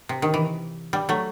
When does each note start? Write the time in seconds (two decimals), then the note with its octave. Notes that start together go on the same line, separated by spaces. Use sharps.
0.09 C3
0.22 D#3
0.34 E3
0.93 G3
1.09 F#3 A3